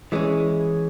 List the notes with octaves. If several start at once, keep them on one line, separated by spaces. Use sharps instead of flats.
E3 G#3 C#4